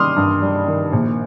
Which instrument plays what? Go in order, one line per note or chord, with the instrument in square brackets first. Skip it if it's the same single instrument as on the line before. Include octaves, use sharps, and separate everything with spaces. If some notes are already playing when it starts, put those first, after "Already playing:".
Already playing: [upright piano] D#3 G3 C6 D6 D#6 F6
G2
G3
D#3
A#1